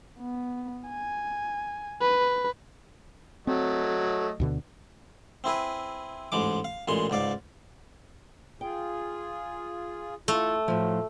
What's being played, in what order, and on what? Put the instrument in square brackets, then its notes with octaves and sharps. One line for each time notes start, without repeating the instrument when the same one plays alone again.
[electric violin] B3
G#5
B4
[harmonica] F#3 A3 D#5 [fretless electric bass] C4
[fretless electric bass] D2 B2 D3
[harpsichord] C4 E4 G#4 B4
A1 G#2 G#3 D6
F5
A1 A#2 G#3 C6
C#2 G#2 D5 F5
[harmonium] F4 G#4 [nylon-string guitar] G5
[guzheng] A3 [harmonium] E4 F4 A4
[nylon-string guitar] A2 F3 [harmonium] F#3